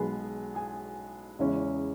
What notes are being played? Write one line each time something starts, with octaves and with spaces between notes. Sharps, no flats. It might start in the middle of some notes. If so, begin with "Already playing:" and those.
Already playing: B1 B2 G#3 B3 G#4 G#5
G#4 G#5
E2 C#3 G#3 C#4 E4